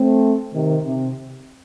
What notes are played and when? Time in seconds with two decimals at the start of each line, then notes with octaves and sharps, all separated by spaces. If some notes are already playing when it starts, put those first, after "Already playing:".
Already playing: A3 C4
0.53 C3 D#3
0.85 C3